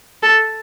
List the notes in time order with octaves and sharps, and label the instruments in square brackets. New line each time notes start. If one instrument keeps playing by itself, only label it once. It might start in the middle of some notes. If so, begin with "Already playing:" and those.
[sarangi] A4